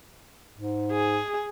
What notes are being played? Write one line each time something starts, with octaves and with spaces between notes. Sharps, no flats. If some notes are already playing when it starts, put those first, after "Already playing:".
G#2
G#4